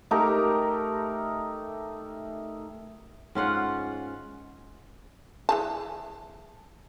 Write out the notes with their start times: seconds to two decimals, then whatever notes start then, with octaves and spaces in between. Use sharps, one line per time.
0.11 A3 D#4 G4 A#4
3.35 G#2 C#4 F4 F#5
5.49 E3 G#4 A5